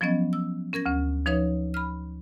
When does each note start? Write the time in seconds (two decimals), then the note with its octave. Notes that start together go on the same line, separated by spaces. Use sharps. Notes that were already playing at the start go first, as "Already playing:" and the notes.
0.01 F3 F#3 B3 C#4 D#5
0.33 E6
0.73 C#4 A#4 G#6 A#6
0.86 D2 C#4
1.26 F3 D#4 B4 C#5 E5
1.74 B5 F6